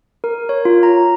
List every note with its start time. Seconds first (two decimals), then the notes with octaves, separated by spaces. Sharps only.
0.24 A#4
0.49 C#5
0.65 F4
0.83 A#5